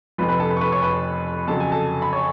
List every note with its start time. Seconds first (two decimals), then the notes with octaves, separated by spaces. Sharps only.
0.18 F1 F2 F3 B4 B5
0.28 B4 B5
0.40 A4 A5
0.50 B4 B5
0.57 C#6
0.61 B4 B5
0.72 C#5 C#6
0.83 B4 B5
1.47 F2 C#3 F#3 A5
1.60 G#5
1.72 A4 A5
2.02 B5
2.13 C#5 C#6